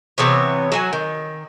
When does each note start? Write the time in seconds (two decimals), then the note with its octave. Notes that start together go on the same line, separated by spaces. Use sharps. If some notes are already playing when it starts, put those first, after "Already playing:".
0.18 C3 E3 B3 C#5
0.72 F#3 F#4 G#5
0.93 D#3